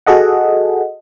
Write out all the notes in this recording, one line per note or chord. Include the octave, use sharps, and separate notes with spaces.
F#4 G#4 A4 D#5 F#5